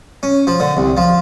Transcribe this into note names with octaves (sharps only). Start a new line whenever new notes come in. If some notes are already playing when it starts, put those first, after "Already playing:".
C#4
F3
D3
C2
F3